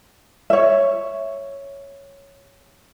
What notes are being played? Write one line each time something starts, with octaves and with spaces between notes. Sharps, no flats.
C#5 E5